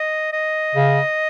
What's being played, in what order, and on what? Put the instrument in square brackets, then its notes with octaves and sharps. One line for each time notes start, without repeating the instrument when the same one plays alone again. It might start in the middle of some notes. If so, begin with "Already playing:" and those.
Already playing: [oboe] D#5
D#5
[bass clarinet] C#3